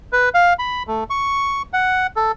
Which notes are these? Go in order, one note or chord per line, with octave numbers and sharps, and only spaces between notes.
B4
F5
B5
A3
C#6
F#5
A4